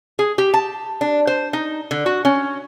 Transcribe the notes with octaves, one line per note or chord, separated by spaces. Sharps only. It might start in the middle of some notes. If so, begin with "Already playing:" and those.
G#4
G4
A5
D4
C5
D#4
D3
F#4
C#4